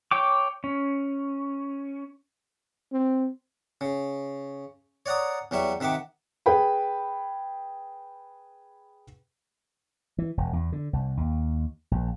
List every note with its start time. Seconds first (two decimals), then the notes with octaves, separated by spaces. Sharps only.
0.11 C#5 G5 D6
0.64 C#4
2.92 C4
3.81 C#3
5.06 C#5 D5 F#5 A#5 D#6
5.51 E2 F#3 G3 E5 C#6
5.80 C3 D#3 E5 F#5 D6
6.46 G#4 B4 G5 B5
10.18 E3
10.37 E1
10.53 E2
10.72 D3
10.93 C2
11.17 D#2
11.91 A#1